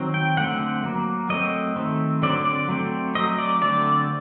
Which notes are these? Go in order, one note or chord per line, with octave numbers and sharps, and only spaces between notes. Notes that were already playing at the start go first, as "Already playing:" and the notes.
Already playing: D#3 F#3 C4
G5
D3 A3 C4 F#5
F#3 A#3
F#3 A3 C4 D#5
D#3 A3 C4
D3 F#3 C4 D5
D5
F#3 A3 C4
F#3 A3 C4 D#5
D5
D3 A3 C4 D5